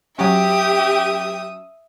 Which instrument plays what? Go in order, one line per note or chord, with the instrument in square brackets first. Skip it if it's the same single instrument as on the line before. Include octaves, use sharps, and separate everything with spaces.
[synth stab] F#3 C#4 [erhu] G4 [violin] E5 D#6